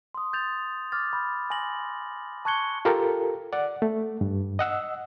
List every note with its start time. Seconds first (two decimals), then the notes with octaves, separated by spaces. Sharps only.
0.15 C6 D#6
0.33 G6 A6 F7
0.92 D6 F6 A6
1.13 B5 G6
1.50 G#5 C6 A#6 F#7
2.45 A5 C#6 F#6 G#6 C#7 G7
2.85 F4 G4 A4 A#4
3.53 D5 F#5
3.82 A3
4.21 G2
4.59 D#5 F#5 E6